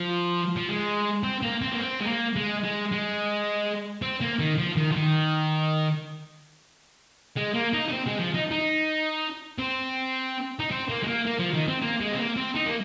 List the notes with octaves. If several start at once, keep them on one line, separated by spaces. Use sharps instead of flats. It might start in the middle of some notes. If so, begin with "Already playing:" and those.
Already playing: F3
F3
G#3
C4
A#3
C4
A#3
C4
G#3
A#3
G#3
G#3
G#3
C4
A#3
D#3
F3
D#3
F3
D#3
G#3
A#3
D#4
D#4
C4
G#3
F3
D#4
D#4
C4
D#4
C4
A#3
G#3
A#3
A#3
F3
D#3
C4
A#3
G#3
C4
A#3
C4
D#4
A#3